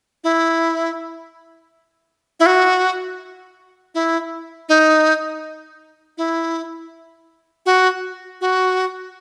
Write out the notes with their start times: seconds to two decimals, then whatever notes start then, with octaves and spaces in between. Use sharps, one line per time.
0.24 E4
2.40 E4
2.46 F#4
3.95 E4
4.69 D#4
6.18 E4
7.66 F#4
8.41 F#4